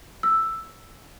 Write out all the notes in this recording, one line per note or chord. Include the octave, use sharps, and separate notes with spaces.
E6